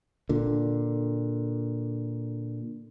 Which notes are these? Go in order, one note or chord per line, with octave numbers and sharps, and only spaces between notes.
A#2 D3